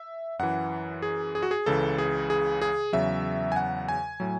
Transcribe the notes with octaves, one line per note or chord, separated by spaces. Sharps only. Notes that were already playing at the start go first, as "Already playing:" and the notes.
Already playing: E5
F#2 E3 F#5
G#4
G#4
F#4
G#4
C#2 C#3 E3 A4
G#4
G#4
G#4
E2 C#3 F#3 E5
G#5
F#5
G#5
A2 F#3